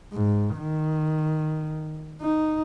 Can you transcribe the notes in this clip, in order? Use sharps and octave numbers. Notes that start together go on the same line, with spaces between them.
G#2
D#3
D#4